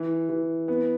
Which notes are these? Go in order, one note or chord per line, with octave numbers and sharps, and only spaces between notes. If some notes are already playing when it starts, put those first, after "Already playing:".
Already playing: E3
E3
B3